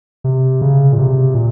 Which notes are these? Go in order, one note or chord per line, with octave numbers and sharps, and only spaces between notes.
C3
C#3
A#2
C3
A#2